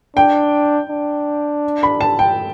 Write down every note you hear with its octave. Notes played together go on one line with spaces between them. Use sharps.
D4 G5
D4
B5
A5
G5